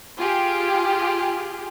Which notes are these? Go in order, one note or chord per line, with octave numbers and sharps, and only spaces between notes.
F4 G4 G#4